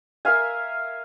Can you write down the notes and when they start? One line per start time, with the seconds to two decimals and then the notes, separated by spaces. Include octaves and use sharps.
0.25 A#4 E5 F5 G#5